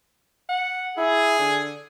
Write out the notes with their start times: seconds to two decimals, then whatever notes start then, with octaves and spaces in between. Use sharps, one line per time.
0.49 F#5
0.97 E4 G#4
1.39 D3